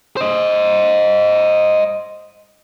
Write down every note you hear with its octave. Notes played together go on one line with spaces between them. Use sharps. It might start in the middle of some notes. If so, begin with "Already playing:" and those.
C5 D#5